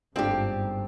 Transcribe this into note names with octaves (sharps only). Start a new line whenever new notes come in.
G1 G#2 A3 C4 D4 F4 G4